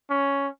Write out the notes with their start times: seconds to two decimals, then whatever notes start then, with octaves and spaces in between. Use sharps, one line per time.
0.10 C#4